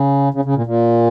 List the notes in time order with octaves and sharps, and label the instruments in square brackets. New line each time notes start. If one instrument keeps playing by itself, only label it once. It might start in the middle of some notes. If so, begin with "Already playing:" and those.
Already playing: [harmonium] C#3
C#3
C#3
A#2
A#2